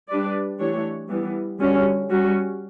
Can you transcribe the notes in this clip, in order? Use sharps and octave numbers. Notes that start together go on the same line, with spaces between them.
G3 D4 G4 B4 D5
E3 A3 D4 G4 C#5
E3 G3 B3
D3 G3 C#4 F#4
G3 C#4 F#4